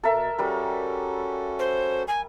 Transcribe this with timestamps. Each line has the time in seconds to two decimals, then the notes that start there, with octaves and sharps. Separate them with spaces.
0.03 B2 A4 A#4 E5
0.38 G3 C#4 F#4 A4 A#4
1.58 C5
2.07 G#5